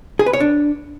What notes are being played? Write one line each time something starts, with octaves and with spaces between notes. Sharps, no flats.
G#4
B4
C#5
D4